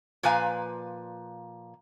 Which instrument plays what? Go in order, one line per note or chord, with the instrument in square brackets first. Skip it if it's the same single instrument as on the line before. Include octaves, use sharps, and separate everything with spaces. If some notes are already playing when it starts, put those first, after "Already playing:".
[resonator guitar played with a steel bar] A#2 F3 B4 F5 G#5 A#5